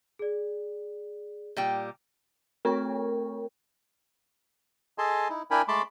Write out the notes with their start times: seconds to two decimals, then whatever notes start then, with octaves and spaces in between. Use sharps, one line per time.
0.19 G#4 D5
1.57 A#2 G3 G5
2.65 A3 C4 A#4 C#5 G5 C#6
4.98 G#4 A4 D#5 G#5 A5 C6
5.29 D#4 E4
5.51 D4 E4 A#4 G5 G#5 B5
5.68 G#3 A3 A5 B5 C6 D6